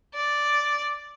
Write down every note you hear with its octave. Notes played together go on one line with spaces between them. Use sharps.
D5